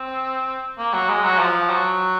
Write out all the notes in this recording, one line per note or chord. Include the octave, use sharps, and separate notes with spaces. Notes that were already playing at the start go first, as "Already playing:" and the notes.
Already playing: C4
A#3
F#3
G#3
F#3
F3
F#3